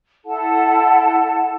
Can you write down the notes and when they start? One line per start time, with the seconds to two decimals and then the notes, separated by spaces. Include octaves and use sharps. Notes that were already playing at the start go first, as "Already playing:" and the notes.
0.25 E4 A4 F#5 A5